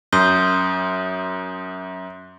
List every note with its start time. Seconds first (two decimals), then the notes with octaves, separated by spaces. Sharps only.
0.13 F#2 C6 D#6 G6